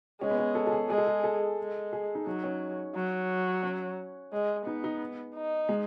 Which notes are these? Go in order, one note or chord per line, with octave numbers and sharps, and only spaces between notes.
G#3 C#4
B3
C#4
A4
A4
G#4
G#3 G#4
A4
G#4
A4
G#3
G#4
D#4
F#3 D#4
C#4
F#3
C#4
G#3
B3 D#4
D#4
D#4
G#3